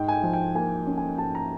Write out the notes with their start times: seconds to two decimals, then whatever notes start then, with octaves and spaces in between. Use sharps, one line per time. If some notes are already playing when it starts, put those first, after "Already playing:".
Already playing: G#2 G5
0.08 G#5
0.12 G5
0.23 F3
0.33 G5
0.55 A#3 G#5
0.86 C#4
0.98 G#5
1.18 G#2 A5
1.35 A#5